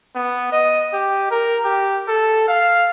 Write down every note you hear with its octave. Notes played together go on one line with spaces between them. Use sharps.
B3
D#5
G4
A#4
G4
A4
F5